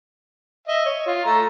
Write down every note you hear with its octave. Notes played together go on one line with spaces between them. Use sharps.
D#5 E5
C#5
F4
A3 A#5